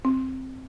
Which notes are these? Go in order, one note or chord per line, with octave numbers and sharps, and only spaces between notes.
C4